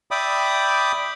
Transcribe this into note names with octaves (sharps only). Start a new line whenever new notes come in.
D5 E5 G5 B5 D6 D#6